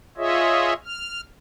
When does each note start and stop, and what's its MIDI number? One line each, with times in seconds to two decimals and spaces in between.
0.17 0.73 65
0.17 0.73 68
0.17 0.73 73
0.17 0.73 75
0.17 0.73 76
0.85 1.21 89